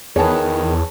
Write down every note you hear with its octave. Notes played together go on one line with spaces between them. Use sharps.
E2 D#3 G#4 B4 C#5 A5